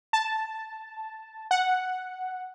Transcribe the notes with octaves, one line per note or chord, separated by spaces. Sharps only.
A5
F#5